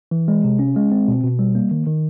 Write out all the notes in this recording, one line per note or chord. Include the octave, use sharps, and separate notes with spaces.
E3
G#3
C3
C#4
G#3
C4
B2
B2
G3
A#3
D#3
D#3